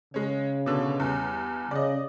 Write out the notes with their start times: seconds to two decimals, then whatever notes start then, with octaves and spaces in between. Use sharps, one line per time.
0.14 C#3 G#3 C#4
0.66 B2 D3
1.00 E2 G2
1.71 C#3 D5 D#5